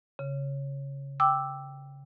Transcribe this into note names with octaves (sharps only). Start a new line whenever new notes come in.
C#3
G5 D6 E6